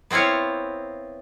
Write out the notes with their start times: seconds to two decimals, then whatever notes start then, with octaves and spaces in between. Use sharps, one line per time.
0.10 B3 C4 E4 F4 C#5